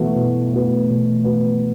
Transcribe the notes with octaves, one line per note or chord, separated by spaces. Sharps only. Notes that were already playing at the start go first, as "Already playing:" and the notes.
Already playing: B2 E3 A3 B3 F#4 B4
B2
B3 F#4 B4
B2
B3 F#4 B4